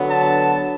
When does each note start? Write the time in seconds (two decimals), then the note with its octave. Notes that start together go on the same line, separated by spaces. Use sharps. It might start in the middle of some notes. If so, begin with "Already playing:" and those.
Already playing: D3 F#3 B3
0.10 A5